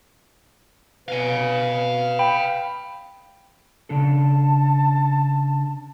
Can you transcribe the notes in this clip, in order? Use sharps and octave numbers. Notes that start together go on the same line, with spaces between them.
B2 B4 F5 G#5
G5 B5
C#3 D4 A4 A5